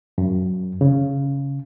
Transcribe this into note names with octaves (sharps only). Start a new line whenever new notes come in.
F#2
C#3